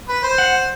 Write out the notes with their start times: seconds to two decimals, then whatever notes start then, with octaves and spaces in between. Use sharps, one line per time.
0.09 B4
0.23 C5
0.38 F#5